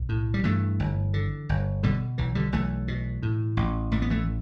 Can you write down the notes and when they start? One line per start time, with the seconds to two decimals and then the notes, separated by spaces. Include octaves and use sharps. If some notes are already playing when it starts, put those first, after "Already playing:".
Already playing: B1
0.09 A2
0.34 G3
0.44 G2 E3 A3
0.80 G1
1.14 D3
1.49 G1
1.83 B2 D3 G3
2.18 B1 E3
2.35 D3 G3
2.52 B1 E3 A3
2.88 B2
3.23 A2
3.57 A1
3.91 A1 A3
4.02 B3
4.10 E3 A3